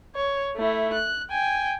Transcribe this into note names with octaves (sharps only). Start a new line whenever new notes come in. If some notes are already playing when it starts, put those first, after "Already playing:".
C#5
A3 E4
F#6
G5 G#5